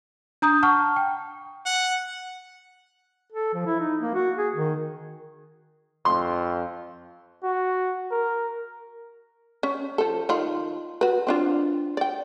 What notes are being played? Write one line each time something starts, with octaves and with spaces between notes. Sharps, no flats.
D4 A#5 D#6 G6
F#5 A5 C#6 F6
G5
F#5
A4
F3
E4
D#4
A#3
F#4
G#4
D#3
F2 C6
F#4
A#4
C#4
F3 A4
D#3 F4 B5
F#4 B4
C4 D4 F4
D5 G5